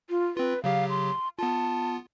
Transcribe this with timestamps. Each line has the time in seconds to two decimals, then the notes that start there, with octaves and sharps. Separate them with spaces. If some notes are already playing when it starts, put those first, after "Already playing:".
0.10 F4
0.37 C4 F4 B4
0.64 C#3 F#3 G4 F5
0.89 C6
1.39 B3 F4 A5